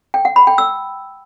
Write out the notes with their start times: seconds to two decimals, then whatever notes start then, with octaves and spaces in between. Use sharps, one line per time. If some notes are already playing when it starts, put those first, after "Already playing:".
0.14 G5
0.25 F#5
0.36 B5
0.47 G5
0.58 E6